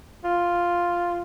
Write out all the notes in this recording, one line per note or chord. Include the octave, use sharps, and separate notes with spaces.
F4